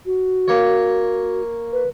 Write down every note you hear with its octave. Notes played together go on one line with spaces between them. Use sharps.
F#4
A#3 C#5
B4